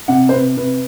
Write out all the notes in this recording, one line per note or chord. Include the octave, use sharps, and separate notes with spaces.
C3 F#5
C5
C3 B4
C3 B4